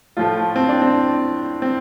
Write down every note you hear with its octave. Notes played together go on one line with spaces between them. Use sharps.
A2 F3 A3 F4
C4
D4
C4
C4